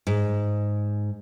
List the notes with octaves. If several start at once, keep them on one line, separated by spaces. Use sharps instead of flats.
G#2